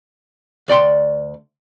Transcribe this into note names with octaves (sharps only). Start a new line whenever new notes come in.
D2 D5 G5 C6